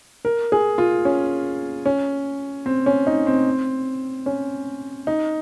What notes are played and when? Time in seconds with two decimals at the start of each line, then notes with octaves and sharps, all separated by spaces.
0.25 A#4
0.52 G#4
0.78 F4
1.05 C#4
1.86 C#4
2.66 C4
2.86 C#4
3.07 D#4
3.27 C4
4.26 C#4
5.07 D#4